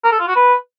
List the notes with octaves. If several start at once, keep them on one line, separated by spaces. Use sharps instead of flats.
A#4
A4
F4
F#4
B4